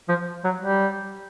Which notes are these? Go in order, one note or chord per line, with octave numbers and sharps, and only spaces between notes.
F3
F#3
G3